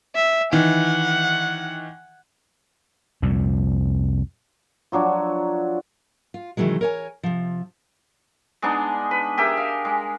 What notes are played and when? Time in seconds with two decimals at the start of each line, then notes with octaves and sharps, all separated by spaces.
0.16 E5
0.53 D#3 E3 F#5
3.22 C2 F2 A#2
4.92 F3 F#3 D4 C#5
6.34 F4
6.57 C3 D#3 E3 F#3 G#3
6.81 A#4 C#5 G#5
7.23 C3 F3
8.62 G#3 B3 D4 D#4
9.11 B4
9.37 G4 G#4 A#4 E5
9.57 F5
9.85 G#3